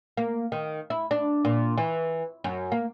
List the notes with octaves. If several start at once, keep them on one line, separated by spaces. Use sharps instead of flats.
A#3
D#3
E4
D4
A#2
E3
F#2
A#3